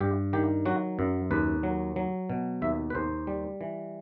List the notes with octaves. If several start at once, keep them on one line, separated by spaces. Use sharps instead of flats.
G2 G4
D#3 G4
F#3 F#4
F#2
D#2 B4
F#3
F#3
B2
D#2 E5
B4
D#2 C5
G3
E3